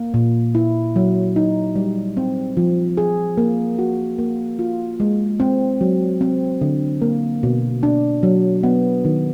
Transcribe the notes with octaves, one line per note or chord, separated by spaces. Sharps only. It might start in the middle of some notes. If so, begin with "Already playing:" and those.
Already playing: A#3
A#2
E4
F#3
D#4
G3
C4
F3
G#4
A#3
F#4
A#3
F4
G#3
C4
F#3
C4
D3
A#3
B2
D4
F#3
B3
D#3